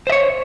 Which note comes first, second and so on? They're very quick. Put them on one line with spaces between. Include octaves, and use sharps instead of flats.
C5 E5 C#5